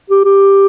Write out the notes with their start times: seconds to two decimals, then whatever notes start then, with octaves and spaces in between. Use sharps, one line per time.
0.10 G4
0.25 G4